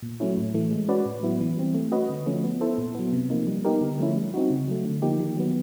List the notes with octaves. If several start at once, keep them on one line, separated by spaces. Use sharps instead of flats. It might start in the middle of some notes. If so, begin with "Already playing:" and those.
A#2
F#3 A3 C#4 E4
A2
E3 A3
G#3
C#4 F#4 B4 D5
A2
F#3 B3 E4
E3
G3 C4
A3
C#4 F#4 B4 D#5
D3
F3 A3 C#4
B3
E4 A4 C5
A#2
F#3 B3
C3
F3 A#3 D#4
G3
B3 D#4 G4 A#4
D3
F3 A3 C#4 E4
G3
C4 D#4 F#4
C#3
F#3 A3
D3
F3 A#3 D#4 G4
D#3
F#3 B3